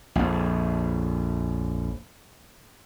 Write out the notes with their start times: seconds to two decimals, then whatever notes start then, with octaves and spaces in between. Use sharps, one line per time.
0.16 A#1 F2